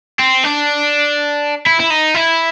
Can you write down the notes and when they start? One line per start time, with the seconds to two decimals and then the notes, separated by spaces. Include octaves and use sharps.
0.19 C4
0.44 D4
1.66 E4
1.80 E4
1.90 D#4
2.15 E4